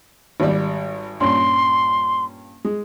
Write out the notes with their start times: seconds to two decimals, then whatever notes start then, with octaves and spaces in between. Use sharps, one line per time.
0.40 G#1 G3
1.20 G2 A#2 C#4 C6
2.65 G#3